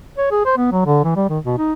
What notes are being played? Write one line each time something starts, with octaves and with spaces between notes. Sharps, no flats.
C#5
G#4
C5
B3
F#3
D3
E3
G3
D#3
B2
D#4